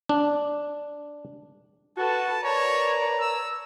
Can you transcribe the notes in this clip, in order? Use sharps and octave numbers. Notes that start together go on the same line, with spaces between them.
D4
F#4 A4 B4 A5
A#4 B4 C#5 D5 A5 A#5
E6